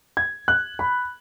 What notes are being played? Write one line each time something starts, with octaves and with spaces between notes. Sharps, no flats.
G#6
F#6
B5